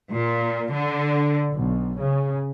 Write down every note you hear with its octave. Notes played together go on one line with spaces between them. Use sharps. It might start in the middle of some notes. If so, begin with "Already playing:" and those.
A#2
D3
B1
C#3